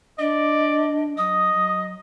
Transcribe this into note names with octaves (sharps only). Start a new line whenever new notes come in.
D4 D5 D#5
F#3 D#5 D#6
F#3